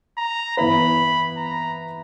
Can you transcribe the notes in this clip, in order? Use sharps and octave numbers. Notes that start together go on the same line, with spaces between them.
A#5
E3 B3 E4 B4 B5
A#5